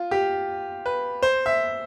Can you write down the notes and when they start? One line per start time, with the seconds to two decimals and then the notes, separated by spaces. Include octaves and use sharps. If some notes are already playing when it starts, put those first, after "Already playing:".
Already playing: F4
0.11 G4
0.86 B4
1.23 C5
1.46 E5